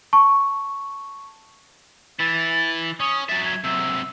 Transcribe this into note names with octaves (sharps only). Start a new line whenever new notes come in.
A5 C#6
E3 E4 A6
C#4 D#6
F#3 E5 A6
G#6
C3 F#3 E6